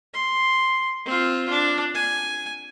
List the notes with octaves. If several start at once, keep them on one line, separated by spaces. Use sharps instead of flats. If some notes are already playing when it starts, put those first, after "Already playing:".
C6
C4 F4
D4
G#5